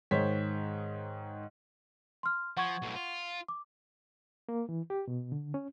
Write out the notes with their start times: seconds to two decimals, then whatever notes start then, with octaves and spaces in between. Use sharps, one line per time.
0.11 G#2 D#3 C5 C#5 B6
2.23 C6 F6
2.57 F3 F#5 C#6 G#6
2.82 B1 A2
2.95 F4
3.48 D6
4.49 A#3
4.69 E3
4.90 G4
5.08 B2
5.32 D3
5.54 C#4